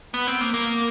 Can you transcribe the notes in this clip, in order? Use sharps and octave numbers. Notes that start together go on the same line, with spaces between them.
B3
C4
A#3
A#3